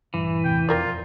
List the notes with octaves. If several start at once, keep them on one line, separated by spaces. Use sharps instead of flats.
A#1 G2 E3
E2 A2 C3 G5
E1 F2 C4 F4 A#4 D5